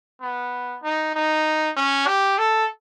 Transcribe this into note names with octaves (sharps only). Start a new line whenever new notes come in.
B3
D#4
D#4
C#4
G4
A4